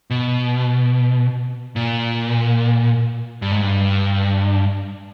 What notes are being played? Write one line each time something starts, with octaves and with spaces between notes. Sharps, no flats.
B2
A#2
G2
G#2
G2